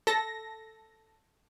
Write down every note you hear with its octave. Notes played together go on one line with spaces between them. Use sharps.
A4 A#6